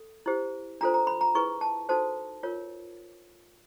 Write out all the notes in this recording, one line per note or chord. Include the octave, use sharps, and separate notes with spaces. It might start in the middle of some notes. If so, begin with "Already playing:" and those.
Already playing: A4
E4 G4 C5
D4 F4 A4 C5 A#5
A#5
B5
A#5
E4 G#4 B4 C#6
A5
D#4 F#4 A4 C5 A5
F4 A#4 C#5